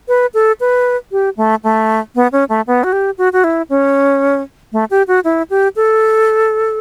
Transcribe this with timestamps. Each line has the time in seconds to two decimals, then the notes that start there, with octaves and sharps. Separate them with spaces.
0.08 B4
0.34 A4
0.60 B4
1.12 G4
1.37 A3
1.64 A3
2.15 B3
2.32 C#4
2.49 A3
2.67 B3
2.84 F#4
2.93 G4
3.18 F#4
3.33 F#4
3.44 E4
3.69 C#4
4.73 A3
4.91 G4
5.08 F#4
5.24 E4
5.50 G4
5.76 A4